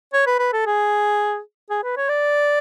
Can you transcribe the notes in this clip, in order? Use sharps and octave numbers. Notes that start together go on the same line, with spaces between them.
C#5
B4
B4
A4
G#4
G#4
B4
C#5
D5